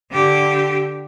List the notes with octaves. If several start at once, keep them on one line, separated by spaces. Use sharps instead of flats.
D3 G4